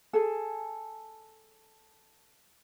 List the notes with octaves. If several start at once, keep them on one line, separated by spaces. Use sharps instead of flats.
G#4 A4